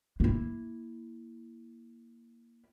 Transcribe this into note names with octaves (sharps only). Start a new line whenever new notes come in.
A#3 E4